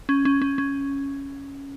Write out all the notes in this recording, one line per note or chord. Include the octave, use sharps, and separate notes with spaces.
C#4
C#4
C#4
C#4